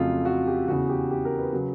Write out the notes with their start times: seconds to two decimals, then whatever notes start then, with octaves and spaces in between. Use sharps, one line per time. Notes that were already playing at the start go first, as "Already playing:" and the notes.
Already playing: F2 C#3 F#3 A3 F4
0.25 F#4
0.47 G4
0.68 E2 C#3 E3 F#4
0.89 G4
1.11 G4
1.25 A#4
1.38 B4
1.53 C#3 F#3